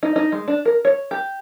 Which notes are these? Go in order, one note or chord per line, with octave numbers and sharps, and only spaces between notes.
D#4
D#4
G#3
D4
A#4
C#5
G4